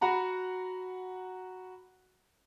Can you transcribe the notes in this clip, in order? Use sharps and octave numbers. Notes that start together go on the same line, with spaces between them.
F#4 F#5 A#5 B5